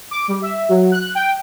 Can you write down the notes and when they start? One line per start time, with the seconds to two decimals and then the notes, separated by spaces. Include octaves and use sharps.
0.11 D6
0.28 G3
0.42 E5
0.69 F#3
0.92 F#6
1.15 G5